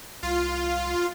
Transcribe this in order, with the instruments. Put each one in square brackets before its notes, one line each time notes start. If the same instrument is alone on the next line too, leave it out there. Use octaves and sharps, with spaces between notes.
[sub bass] C2 [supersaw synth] F4